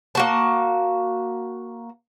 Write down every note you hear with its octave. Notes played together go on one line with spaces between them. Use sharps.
A#3 F#4 A5